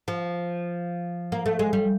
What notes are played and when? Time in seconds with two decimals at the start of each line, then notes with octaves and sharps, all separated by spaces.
0.08 F3
1.32 A#3
1.46 A3
1.59 G#3
1.73 G3